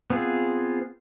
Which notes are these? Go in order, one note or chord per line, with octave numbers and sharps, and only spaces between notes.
B3 C4 F4 G#4